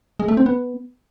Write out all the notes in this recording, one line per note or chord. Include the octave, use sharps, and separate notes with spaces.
G#3
A3
C4
B3